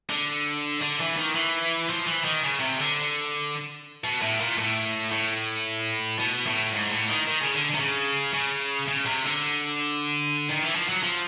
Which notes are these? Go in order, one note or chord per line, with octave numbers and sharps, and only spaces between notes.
D3
D3
E3
D#3
E3
F3
E3
D#3
C#3
C3
D3
B2
A2
A#2
A2
A2
B2
A2
G#2
A2
D#3
D#3
C#3
D3
C3
C#3
C#3
C#3
C3
D3
D#3
E3
F3
F#3
F3